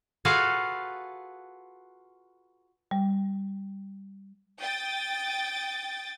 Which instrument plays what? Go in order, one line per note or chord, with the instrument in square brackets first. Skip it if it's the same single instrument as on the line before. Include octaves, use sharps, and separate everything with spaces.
[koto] F4 F#4 G#4 A4 B4 F5
[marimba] G3
[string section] G5 D#6 A6